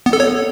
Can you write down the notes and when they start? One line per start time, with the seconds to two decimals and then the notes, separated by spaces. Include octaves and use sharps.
0.06 B3
0.13 A4
0.20 C#5